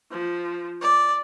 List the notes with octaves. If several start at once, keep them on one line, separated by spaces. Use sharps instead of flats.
F3
D5